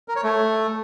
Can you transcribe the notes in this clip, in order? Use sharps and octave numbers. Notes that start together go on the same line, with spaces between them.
A#4
C#5
A3